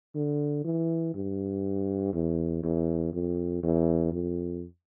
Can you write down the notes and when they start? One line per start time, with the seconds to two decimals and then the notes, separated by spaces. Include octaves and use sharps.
0.15 D3
0.64 E3
1.15 G2
2.13 E2
2.63 E2
3.13 F2
3.63 E2
4.12 F2